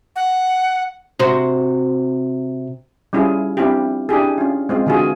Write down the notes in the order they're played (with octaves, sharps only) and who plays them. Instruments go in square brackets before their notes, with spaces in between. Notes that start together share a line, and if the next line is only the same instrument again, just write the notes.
[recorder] F#5
[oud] C3 F#4 C5
[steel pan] G3 C#4 E4 F4 G#4
C4 D4 E4 F4 G4
D4 E4 G4 G#4
C#4 F4
G#3 C4 F4
D3 E3 F4 F#4 G#4